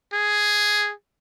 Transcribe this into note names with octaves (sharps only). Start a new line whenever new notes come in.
G#4